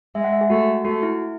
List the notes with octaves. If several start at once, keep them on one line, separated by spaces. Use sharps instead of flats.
G#3 E5
F#5
E5
G#4
A3 F#4
A3 F#4
E4